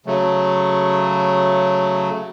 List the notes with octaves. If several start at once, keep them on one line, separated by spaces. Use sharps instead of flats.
C#3 F#3 A3